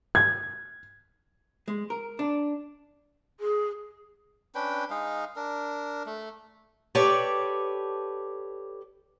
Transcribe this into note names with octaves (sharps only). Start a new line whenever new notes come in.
G#6
G#3
A#4
D4
G#4
C#4 D4 B4 G5
G#3 D#4 F5
D4 A#4
A3
G4 A4 B4 C#5 D5 A5